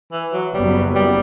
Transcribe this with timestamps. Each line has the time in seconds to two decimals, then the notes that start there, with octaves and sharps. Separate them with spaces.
0.12 E3
0.33 F#3
0.54 F#1 F#2 F#3 G3 B3
0.95 G3